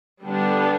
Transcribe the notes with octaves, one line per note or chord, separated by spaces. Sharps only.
D3 G3 B3 D4